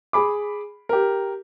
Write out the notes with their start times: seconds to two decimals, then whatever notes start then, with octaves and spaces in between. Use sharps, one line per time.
0.13 G#4 B5 D6
0.89 G4 A#4